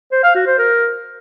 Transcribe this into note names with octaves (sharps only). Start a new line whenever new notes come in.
C5
F5
F#4
C5
A#4